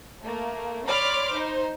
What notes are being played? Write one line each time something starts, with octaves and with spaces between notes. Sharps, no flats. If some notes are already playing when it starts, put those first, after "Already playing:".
A3 A#3
C#5 D5 B5 C6 D6 F6
D#4 C5